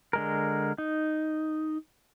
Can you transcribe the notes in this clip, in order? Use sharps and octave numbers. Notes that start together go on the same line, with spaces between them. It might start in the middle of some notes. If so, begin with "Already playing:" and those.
D3 G#3 A#4
D#4